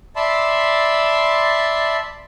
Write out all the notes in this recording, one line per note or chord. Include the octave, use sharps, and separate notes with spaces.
D5 E5 A5 B5 C6